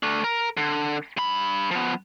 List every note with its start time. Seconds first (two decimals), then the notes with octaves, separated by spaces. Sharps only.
0.03 A3 D4
0.24 A#4
0.57 D3
1.17 G2 B5
1.71 F3 B3